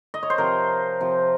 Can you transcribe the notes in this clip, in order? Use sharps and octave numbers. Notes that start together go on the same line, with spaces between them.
D#5
C#5
C5
C3 F3 A#4
C3 F3